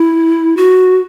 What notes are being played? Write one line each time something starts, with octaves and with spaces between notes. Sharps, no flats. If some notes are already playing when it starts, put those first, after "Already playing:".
Already playing: E4
F#4